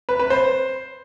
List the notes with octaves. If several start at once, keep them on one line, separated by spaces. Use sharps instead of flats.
B4
B4
C5